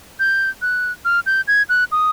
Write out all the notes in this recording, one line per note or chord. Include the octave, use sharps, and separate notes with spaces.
G6
F#6
F6
G6
G#6
F#6
D#6